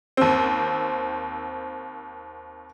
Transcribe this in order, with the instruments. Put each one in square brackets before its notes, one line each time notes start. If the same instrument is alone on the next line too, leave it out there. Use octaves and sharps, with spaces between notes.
[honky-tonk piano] D#2 C4